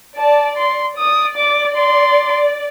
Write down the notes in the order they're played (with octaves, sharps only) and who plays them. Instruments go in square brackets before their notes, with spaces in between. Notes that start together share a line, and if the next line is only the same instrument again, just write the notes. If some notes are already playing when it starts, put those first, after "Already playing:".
[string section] D5 [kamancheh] A5
[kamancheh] C6
[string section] D5 [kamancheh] D#6
[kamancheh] D6
C6